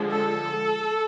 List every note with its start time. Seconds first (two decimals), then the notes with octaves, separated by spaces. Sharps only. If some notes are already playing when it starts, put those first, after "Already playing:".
Already playing: D3 F3 G#3
0.10 A4